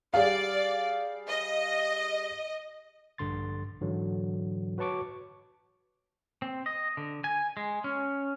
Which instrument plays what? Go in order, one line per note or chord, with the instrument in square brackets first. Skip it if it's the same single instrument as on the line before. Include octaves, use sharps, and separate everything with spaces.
[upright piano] G3 G#4 F5 [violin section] D5
[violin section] D#5
[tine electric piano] A#1 G2 D3 C6 A6
G#2 D3 E3 F#3
F#4 B4 C#5 A5 C#6 D6
[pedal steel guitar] C4
D#5
D3
G#5
G#3
C#4